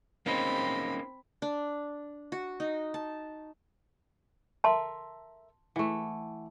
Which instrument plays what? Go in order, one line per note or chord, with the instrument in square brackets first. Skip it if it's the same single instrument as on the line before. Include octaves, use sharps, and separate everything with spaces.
[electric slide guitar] A#3 C#4 D#4 [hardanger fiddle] C4 B5
[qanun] D4
F#4
D#4
A5
[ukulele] A4 A#4 E5 [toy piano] A5 C6
[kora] E3 A3 [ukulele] F#5